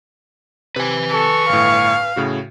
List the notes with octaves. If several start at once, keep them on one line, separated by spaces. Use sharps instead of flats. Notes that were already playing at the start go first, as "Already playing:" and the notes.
C3 B4 G#5
A4 C#6
G1 A2 F5
A2 C#3 F#4